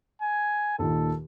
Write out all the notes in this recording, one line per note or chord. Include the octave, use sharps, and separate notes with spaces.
G#5
D#2 A#2 D#3 A4